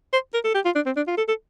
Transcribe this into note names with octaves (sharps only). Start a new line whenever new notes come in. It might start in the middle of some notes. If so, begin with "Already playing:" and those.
C5
A#4
A4
G4
F4
D4
C4
D4
F4
A4
A4